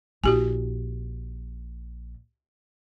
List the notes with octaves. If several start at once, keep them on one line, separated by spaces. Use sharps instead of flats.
A#1 E4 F#4 G4 G#5